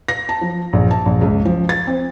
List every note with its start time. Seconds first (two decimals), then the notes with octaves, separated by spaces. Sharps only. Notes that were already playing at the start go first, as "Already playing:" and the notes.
0.08 A#6
0.29 A5
0.41 F3
0.73 A#1
0.91 A5
1.06 A#1
1.21 C#2
1.45 F3
1.69 A6
1.87 C4